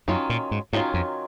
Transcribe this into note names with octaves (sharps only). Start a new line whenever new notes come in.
F#2 D#3 F#3 C#4 F4
A#2
G#2
G#2 D#3 F#3 C#4 F4
F2